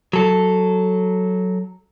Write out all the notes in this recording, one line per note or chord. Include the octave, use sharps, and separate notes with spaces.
F#3 A4